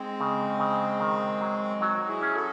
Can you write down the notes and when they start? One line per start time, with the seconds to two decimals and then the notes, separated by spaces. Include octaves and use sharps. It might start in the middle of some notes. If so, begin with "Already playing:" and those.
Already playing: G#3 C4 D#4
0.20 C#3
0.60 C#3
1.00 D#3
1.41 F#3
1.81 F#3 D#4 F#4
2.08 E4 G#4
2.22 C#4
2.34 F#4 A4